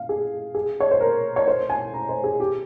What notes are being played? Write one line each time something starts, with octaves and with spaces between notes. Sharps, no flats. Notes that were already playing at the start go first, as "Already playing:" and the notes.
Already playing: F5
G#4
G#4
C#5
C5
A#4
C#5
C5
G#5
A#5
C5
G#4
G4